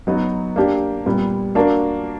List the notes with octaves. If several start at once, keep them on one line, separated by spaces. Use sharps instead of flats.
F#3 B3 D#4 F#4
A#3 D4 G4
A#2 G3 B3
A#3 D4 F#4 A#4